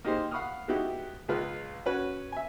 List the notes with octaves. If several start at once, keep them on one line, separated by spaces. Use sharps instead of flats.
A#3 D#4 G4 G#4 C5
F5 F#5 B5 C#6 D#6 F6
G#3 B3 D#4 E4 F#4 G4
C#2 G#3 F4 B4 F5
C#4 F#4 B4
E5 G#5